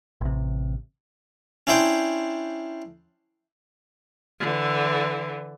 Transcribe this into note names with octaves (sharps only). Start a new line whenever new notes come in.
A1 C3
C#4 D4 E4 C5 G5
D3 E3